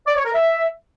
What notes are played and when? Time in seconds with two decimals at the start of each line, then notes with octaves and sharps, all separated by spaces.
0.07 D5
0.15 C#5
0.24 A#4
0.33 E5